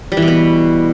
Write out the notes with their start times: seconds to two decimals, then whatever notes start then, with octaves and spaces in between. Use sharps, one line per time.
0.12 G3
0.17 E3
0.22 B2
0.28 B3